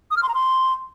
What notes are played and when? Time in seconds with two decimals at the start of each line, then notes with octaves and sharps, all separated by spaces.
0.11 D#6
0.17 F6
0.23 C6
0.29 A#5
0.35 C6